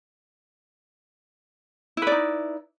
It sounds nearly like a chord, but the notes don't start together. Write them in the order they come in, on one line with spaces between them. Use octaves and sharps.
E4 B4 D5 D#4